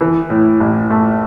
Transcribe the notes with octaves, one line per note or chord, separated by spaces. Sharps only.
E3
A2
A1
A3